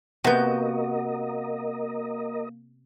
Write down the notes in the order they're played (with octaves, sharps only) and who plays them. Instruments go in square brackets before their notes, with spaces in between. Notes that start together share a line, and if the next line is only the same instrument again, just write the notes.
[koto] C3 B3 [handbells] A#3 [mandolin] F#4 G6 [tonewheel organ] A#4 D#5